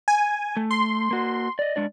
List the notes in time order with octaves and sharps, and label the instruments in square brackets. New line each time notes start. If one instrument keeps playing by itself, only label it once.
[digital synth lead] G#5
[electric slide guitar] A3
[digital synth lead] C6
[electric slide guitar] A#3 F#4
D5 D#5
G#3 D4 D5